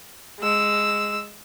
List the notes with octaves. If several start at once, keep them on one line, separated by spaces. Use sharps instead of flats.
G#3 E6